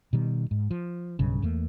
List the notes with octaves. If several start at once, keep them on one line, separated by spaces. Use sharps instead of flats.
B2 D#3 G3
G#2
F3
B1 G2 C#3
E2 A3 A#3